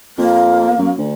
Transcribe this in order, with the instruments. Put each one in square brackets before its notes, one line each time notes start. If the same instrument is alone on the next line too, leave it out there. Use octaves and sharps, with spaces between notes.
[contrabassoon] F2 [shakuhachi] A#3
[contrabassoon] F#2
D2